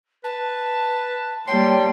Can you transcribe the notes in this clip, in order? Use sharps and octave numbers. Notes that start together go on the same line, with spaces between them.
B4 A5
G3 A#3 C#5 G5 A5 C6